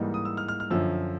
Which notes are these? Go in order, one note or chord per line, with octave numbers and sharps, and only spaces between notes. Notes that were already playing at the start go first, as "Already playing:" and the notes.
Already playing: G#2 E3 G3 A#3 D#4
D#6
E6
F6
F6
F6
F#2 D3 F3 E6